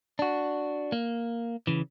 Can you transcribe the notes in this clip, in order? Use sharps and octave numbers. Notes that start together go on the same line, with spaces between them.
D4 F#4
A#3
C#3 E3